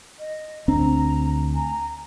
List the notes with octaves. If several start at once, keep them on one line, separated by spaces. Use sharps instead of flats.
D#5
D2 C4 D4 A#5
G#5 A#5